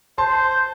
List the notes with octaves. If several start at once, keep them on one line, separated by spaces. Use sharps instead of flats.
C5 A5 C6